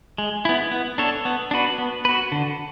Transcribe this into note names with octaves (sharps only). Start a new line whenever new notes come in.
G#3
B3 E4
B3
D4 A4 C#5
B3
D4 F#4 B4
B3
F#4 B4
D3